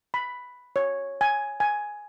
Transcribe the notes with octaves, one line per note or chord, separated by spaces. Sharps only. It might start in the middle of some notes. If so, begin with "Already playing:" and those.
B5
C#5
G#5
G#5